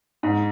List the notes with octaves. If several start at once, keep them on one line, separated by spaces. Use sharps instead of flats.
G#2